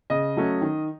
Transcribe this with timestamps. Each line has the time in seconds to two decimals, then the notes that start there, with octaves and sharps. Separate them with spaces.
0.10 C#3 D#5
0.37 F#3 A3 C#4
0.61 D#3